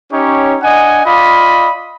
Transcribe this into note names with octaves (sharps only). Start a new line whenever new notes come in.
C#4 D#4 G4 C#5
D4 D#5 F#5 G#5
F4 D5 D#5 B5